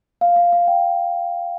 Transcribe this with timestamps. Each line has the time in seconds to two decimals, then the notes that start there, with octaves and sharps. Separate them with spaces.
0.21 F5
0.36 F5
0.53 F5
0.68 G5